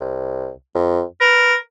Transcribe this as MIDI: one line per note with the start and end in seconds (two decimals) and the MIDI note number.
0.01 0.51 36
0.75 1.03 41
1.21 1.55 70
1.21 1.56 71